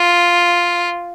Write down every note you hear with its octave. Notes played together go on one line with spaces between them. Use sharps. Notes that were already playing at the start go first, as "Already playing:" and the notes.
Already playing: F4